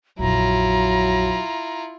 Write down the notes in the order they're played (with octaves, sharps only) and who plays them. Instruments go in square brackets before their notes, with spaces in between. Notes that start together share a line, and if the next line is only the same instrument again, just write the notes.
[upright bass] A#1 F2 [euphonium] F#3 [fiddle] E4 F4 [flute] A#5